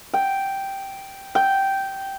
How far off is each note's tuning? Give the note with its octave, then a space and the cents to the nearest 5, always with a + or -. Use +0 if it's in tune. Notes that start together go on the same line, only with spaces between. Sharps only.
G5 -5
G5 -10